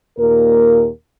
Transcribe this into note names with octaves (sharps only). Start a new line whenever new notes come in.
D#2 A#2 A#3 A#4